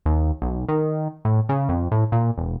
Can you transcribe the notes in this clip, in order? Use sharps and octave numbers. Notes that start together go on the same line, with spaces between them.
D#2
B1
D#3
A2
C#3
F2
A2
A#2
E1